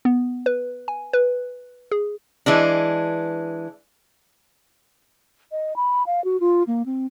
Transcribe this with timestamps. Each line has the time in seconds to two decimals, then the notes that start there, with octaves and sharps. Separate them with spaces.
0.05 B3
0.46 B4
0.88 G#5
1.13 B4
1.92 G#4
2.46 E3 G#3 D4
5.51 D#5
5.76 B5
6.06 F5
6.24 F#4
6.40 F4
6.67 A#3
6.86 C4